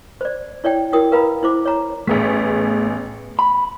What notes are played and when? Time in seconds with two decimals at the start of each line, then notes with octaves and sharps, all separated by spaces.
0.21 C5 D5
0.64 E4 C#5 D5 G5
0.93 E4 F#4 A#4 G5 D#6
1.12 A#4 B4 F5 A#5 B5
1.43 E4 C5 D6
1.65 C#5 A#5
2.07 A1 A3 B3 G#4 B6
3.39 B5